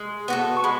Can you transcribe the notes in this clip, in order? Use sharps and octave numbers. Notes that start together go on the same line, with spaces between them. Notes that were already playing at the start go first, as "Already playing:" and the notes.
Already playing: G#3
B3 F#4 A4
C#6
G#3 B5